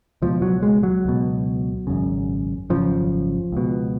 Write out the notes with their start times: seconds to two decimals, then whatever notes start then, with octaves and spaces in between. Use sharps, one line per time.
0.22 C#2 B2 F3
0.42 F#3
0.63 G#3
0.83 F#3
1.05 C#2 B2
1.87 G#1 F#2 C#3
2.70 G#1 F#2 C#3 F3
3.52 C#2 B2